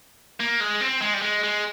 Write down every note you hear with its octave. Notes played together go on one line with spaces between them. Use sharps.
A#3
G#3
C4
G#3
G3
G#3
G#3